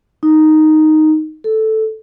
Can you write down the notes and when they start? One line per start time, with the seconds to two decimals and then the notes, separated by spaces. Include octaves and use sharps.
0.23 D#4
1.44 A4